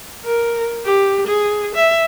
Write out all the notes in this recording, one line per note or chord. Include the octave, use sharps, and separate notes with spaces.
A#4
G4
G#4
E5